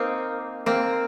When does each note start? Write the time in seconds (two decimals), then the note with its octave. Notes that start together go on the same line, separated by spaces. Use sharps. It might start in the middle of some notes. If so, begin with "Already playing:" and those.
Already playing: A#3 C4 D#4
0.66 A#3 C4